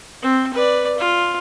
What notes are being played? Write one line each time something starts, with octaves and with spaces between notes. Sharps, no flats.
C4
B4 D5
F4